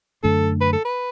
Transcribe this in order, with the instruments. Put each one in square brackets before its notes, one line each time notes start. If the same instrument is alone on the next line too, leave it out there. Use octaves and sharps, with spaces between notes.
[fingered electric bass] F#2 D3 A3 D4 [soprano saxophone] A4
[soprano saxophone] B4
A4
B4